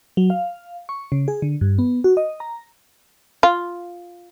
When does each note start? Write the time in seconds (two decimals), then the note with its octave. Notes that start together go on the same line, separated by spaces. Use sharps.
0.17 F#3
0.30 F5
0.89 C#6
1.12 C#3
1.28 G#4
1.42 D3
1.61 G2
1.79 B3
2.04 F#4
2.17 D#5
2.40 A#5
3.43 F4